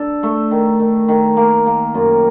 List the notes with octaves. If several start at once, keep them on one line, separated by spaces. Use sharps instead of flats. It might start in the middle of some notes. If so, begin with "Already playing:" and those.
Already playing: D4 A4
A3
D#3
D#3
D#3
A#3
A#3
F#2